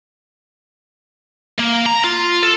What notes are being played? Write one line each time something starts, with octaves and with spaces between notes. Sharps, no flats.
A#3
A#5
F4
A4